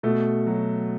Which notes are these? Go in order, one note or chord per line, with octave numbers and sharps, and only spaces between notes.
B2 A3
F#3